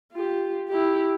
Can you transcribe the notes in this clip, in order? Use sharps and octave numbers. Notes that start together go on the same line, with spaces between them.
F4 G4
E4 G4